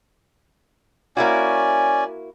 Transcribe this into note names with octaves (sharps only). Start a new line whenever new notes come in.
A#3 C#4 E4 F#4 D5 G#5